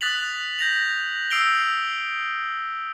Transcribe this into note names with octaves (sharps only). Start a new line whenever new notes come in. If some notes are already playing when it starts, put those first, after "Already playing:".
D#6 F#6 A6 B6 F7 F#7
G6 A#6 F7
D#6 E6 C7 D7 F7 G7